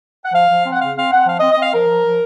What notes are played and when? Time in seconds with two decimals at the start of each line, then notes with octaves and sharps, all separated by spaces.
0.24 F#5
0.33 F3 F5
0.49 F3
0.64 C4
0.72 F#5
0.79 C#3 F5
0.95 C4 F5
1.10 C4 F#5
1.26 F3 F5
1.38 D#5
1.41 C4
1.50 D#5
1.57 C4 F5
1.73 F3 A#4
1.88 F3
2.05 F3